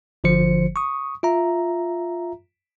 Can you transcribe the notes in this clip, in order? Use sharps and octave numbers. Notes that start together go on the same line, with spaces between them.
G1 D3 F3 C5 C#7
C#6 D#6
F4 E5 A#5